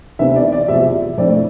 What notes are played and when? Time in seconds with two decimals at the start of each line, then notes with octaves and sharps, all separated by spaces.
0.19 D2 C3 E3 B3 E5
0.36 D5
0.52 D5
0.68 E2 C3 F3 E5
1.18 F2 D3 A3 C4 E4 D5